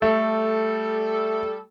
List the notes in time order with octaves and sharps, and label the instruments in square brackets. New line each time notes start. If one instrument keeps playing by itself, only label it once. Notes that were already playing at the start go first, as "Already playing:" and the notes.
[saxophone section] G3 A4 [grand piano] A3